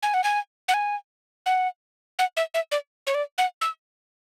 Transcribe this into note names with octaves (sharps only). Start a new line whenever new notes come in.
G#5
F#5
G#5
F#5
G#5
F#5
F#5
E5
E5
D5
C#5
D5
F#5
E6